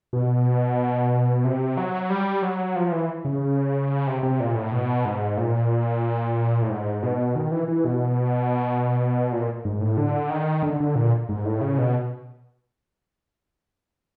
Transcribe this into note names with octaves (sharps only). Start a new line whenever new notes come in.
B2
C3
F#3
G3
F#3
F3
E3
C#3
C3
C3
A#2
A2
B2
G#2
A#2
A2
G#2
B2
D#3
E3
E3
B2
A#2
G#2
A2
D3
D#3
D3
D3
A#2
G#2
A2
C#3
B2